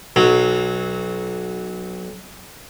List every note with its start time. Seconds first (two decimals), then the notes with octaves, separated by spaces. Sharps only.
0.16 B1 F#3